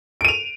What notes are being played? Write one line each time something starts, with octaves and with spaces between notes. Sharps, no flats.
D7 D#7 F7